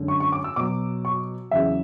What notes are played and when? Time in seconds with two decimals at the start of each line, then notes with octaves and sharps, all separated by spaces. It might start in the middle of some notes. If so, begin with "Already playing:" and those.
Already playing: F#2 D3 G#3
0.08 C#6
0.20 C#6
0.32 D6
0.44 E6
0.56 B2 F#3 D6
1.05 C#6
1.51 E2 C#3 F#3 E5